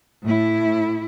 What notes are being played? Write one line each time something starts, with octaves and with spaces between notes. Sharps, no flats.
A2 E4